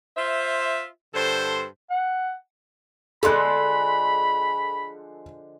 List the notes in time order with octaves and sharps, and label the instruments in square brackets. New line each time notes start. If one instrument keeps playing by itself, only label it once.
[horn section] F4 C5 E5
G2 D3 A4 C5
[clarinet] F#5
[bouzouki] D3 F3 G#3 [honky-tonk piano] A4 C6 F#6 [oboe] B5